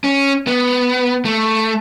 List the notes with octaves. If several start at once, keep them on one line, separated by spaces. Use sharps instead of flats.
C#4
B3
A3